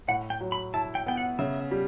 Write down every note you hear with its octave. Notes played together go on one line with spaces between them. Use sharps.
A2 F#5
G5
F#3
B5
E4 A5
G5
B3 G5
F#5
C#3 E5
G3